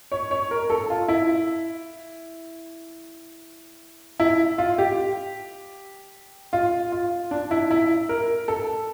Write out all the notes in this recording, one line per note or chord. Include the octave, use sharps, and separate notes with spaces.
C#5
C#5
A#4
A4
F4
E4
E4
F4
G4
F4
F4
D4
E4
E4
A#4
A4